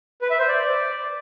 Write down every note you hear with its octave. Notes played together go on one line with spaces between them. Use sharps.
B4
E5
C5
D5